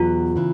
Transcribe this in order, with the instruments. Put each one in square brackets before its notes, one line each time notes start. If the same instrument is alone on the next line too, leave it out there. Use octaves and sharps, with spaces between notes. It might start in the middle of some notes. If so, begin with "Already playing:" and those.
Already playing: [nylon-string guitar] E2 B2 F#3 B3 [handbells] F4
[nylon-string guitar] C#3 E3